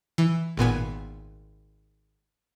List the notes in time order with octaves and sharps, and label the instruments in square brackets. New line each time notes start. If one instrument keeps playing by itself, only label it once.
[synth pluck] E3
G#1 A#2 B3 G#5